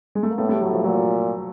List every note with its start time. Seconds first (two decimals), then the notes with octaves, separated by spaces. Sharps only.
0.15 G#3
0.23 A3
0.30 A#3
0.38 A2 A3 B3
0.49 G3 A3
0.61 F#3
0.73 F3
0.84 A#2 F#3